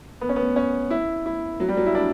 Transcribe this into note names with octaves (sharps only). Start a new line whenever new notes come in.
B3
C#4
B3
C#4
E4
E4
F#3
G3
F#3
E4
D4